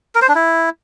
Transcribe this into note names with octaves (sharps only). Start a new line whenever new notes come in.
A#4
C5
D4
E4